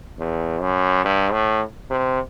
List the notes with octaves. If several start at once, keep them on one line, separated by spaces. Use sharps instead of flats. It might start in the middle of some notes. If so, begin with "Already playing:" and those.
E2
F#2
G2
A2
C3